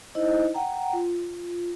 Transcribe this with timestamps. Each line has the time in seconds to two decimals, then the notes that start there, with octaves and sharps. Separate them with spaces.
0.15 D#4 E4 C5 D#5
0.54 F#5 G5 A#5
0.93 F4